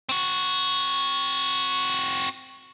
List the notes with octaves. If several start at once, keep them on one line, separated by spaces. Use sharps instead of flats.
C4 F#4